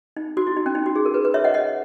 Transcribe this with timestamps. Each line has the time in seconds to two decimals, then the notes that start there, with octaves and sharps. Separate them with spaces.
0.17 D#4
0.37 F#4
0.47 E4
0.56 D#4
0.66 C#4
0.75 D#4
0.86 F#4
0.96 G#4
1.05 A#4
1.14 B4
1.25 B4
1.34 C#5 E5
1.44 D#5 F#5
1.54 D#5 F#5